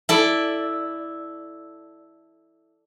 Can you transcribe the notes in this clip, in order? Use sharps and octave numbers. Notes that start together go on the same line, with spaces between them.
E4 A4 D5